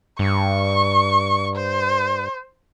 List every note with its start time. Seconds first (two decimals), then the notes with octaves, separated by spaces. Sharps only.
0.19 G2 C#6
1.56 C5